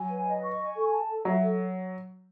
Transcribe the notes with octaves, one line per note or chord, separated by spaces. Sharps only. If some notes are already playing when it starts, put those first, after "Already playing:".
Already playing: F#3 G#5
B4
D#5
C#6
G#5
A4
A5
A4
F#3 E5
A4